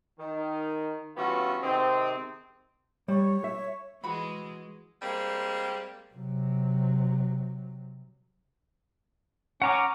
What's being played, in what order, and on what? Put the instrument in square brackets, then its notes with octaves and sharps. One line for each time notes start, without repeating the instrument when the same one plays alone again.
[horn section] D#3
G2 E3 B3 C#4 F4 F#4
C3 D#3 G#3 C4
[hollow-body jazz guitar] G3 [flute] C#5
[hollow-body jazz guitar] E5
[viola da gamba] E3 G#3 [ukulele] F#4 B5
[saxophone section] G3 G#3 A#3 C4
[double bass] C3 F#3
[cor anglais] C#4 [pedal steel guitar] F#5 A#5 D6